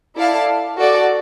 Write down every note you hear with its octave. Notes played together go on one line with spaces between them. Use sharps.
E4 A4 D5 F5 A5
F#4 A4 D5